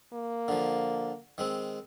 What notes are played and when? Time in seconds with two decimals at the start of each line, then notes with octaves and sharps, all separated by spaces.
0.14 A#3
0.48 D3 F3
1.38 D#3 G#3 C4